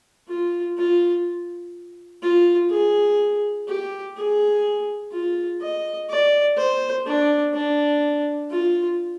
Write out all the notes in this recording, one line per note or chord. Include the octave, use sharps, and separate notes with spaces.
F4
F4
F4
G#4
G4
G#4
F4
D#5
D5
C5
D4
D4
F4